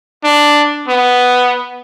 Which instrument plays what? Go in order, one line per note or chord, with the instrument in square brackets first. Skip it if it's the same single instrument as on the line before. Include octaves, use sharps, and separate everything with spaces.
[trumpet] D4
B3